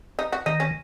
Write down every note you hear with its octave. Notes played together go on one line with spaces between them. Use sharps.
D#4
F#4
D#3 D#4
C#4